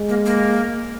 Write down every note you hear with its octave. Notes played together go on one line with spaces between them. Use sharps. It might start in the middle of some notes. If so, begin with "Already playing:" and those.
Already playing: G#3
A#3
A#3